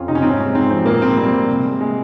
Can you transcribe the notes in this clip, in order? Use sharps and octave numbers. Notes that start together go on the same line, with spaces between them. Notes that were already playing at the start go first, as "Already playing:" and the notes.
Already playing: F2 C#4 F4
C3 D#4
C#4
G#2 C4
C#4
G#3
G#2 C4
F3 C4
A#2 A#3
A#2 C4
G3 C4
G3
C3
G#3
G#3